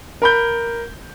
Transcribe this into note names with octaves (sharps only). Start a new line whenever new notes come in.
A#4 B5 G6